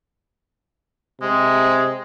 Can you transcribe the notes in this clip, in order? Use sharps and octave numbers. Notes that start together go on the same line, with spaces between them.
C3 G#3